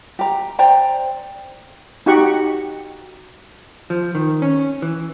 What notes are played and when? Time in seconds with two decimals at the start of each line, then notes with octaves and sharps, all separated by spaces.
0.19 G4 A#5
0.59 C5 D5 G5 A#5
2.06 D#4 F#4 G4 F#5 C#6
3.90 F3
4.15 D#3
4.42 C#4
4.82 E3